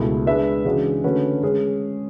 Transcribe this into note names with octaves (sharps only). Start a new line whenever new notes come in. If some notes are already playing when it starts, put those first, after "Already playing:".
Already playing: C#2 B2 A3 E4 G#4
G#3 D4 G#4 B4 E5
C#3 E3 G#3 D4 F#4
D3 A3 C#4 F#4 B4
G#3 C#4 G#4